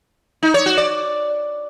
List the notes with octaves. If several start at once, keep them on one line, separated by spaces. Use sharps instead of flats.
D#4
C#5
F#4
D5